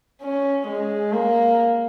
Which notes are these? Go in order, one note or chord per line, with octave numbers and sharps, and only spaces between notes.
C#4
G#3
A#3